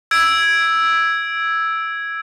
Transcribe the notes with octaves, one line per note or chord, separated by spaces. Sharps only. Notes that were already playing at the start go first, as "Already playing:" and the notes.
E6 G#6 D7